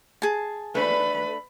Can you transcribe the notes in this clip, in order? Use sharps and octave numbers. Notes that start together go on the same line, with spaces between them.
G#4 A5
A3 D4 B4 B5